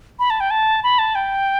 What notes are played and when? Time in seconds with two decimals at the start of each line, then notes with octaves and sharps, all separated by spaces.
0.19 B5
0.30 A5
0.40 G5
0.51 A5
0.83 B5
0.99 A5
1.15 G5